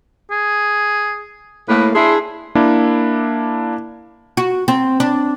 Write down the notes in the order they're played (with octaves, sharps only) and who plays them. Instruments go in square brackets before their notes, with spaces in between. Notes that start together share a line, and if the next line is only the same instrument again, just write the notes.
[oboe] G#4
[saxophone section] A2 A#3 [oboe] B4
[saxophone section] D4 E4 G#4 [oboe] C6
[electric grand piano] A#3 D4 E4
[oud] F#4
C4
D4